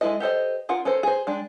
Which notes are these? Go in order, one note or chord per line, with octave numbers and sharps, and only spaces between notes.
G#3 C4 E4 A4 D#5
G4 A4 C5 D#5
C#4 F4 A#4 F#5
C#4 A4 A#4 C5
G#4 C5
G#3 D4 G5